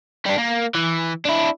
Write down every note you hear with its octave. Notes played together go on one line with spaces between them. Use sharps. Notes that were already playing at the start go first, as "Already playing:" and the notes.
G3 D4
A#3
E3
D4 E4